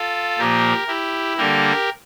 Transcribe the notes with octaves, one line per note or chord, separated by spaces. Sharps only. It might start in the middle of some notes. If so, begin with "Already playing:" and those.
Already playing: F4 A4
A#2 F3 A#3 G4 A#4
E4 G4
D3 G3 A#3 G4 A#4